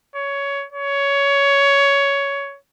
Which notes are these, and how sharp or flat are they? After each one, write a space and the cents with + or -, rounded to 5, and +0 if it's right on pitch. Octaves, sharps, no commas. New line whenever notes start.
C#5 +15
C#5 +15